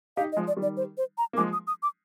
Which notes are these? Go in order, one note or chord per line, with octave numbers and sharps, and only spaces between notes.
D#4 G4 F5
D#5
F3 G#3
D5
D#3 G3
D5
C5
C5
A#5
A#3
F3 G#3 D6
D#6
D#6
D6